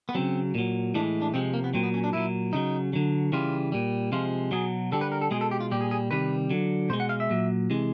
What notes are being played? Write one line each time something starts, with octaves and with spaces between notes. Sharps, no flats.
B3
C#3 F#3 C4
A#2 F#3
A2 E3 G#3 D4
D4
C3 F3 G#3 C4
A#3
B3
A#2 F#3 C4
B3
C#4
D4
A#2 F#3 E4
C#3 F#3 D#4
D3 F#3
C#3 E3 G3 F4
A#2 G3
C3 F3 G#3 F4
B2 F#3 G#4
D3 G3 A4
B4
A#4
A4
B2 G#3 G#4
A4
G4
F4
A#2 G3 G4
G#4
G#4
C3 D#3 G3 B4
D3 F#3
B2 G#3 C5
F#5
F5
E5
A#2 F#3
C3 E3 G#3